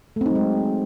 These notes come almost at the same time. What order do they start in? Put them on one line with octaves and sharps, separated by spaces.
A3 C4 D#4 F#3 G#3